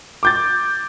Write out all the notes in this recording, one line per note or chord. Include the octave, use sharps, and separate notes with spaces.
D6 G6 A6